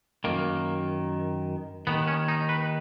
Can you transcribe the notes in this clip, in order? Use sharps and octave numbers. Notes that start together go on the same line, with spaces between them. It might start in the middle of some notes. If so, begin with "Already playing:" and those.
F#2 D#3 A#3
D#2 D#3 B3
C#4
D#4
B4